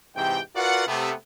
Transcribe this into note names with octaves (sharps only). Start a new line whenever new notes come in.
G#2 C3 E3 G4 G5
F4 F#4 A#4 B4 D5 F#5
C3 A3 B3